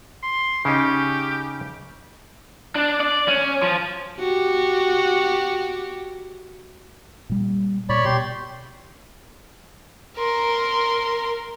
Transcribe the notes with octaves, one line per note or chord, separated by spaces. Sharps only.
C6
C#3 C#4 D#4 G4
D4
D5
C#4
F3
F#4 G4
A#2 G3
A#2 C#5 D5 B5
B2 G4 C6
A#4 C6